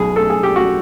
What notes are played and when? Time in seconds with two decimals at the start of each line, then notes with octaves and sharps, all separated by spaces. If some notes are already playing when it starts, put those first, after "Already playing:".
Already playing: B1 B2 G#4
0.16 A4
0.30 G#4
0.43 G4
0.56 F#4